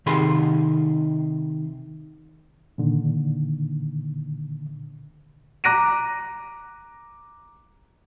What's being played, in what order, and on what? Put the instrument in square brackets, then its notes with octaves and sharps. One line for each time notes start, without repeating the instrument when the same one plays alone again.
[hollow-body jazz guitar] C3 D#3 G#4 B5 C6
[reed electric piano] A#2 D3 D#3
[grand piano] A#5 D6 F#6 A#6 D7 D#7